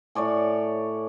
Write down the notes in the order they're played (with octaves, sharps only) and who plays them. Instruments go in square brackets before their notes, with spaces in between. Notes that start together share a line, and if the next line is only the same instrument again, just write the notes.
[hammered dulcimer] A2 C#5 D5 G#5